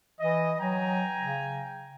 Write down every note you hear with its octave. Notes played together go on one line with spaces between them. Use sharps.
E3 D#5
F#3 G5 G#5 A#5
C#3